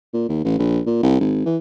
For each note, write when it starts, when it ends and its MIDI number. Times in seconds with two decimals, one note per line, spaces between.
0.14 0.24 46
0.29 0.44 39
0.44 0.54 33
0.58 0.80 34
0.86 0.99 46
1.03 1.18 36
1.20 1.44 32
1.46 1.57 52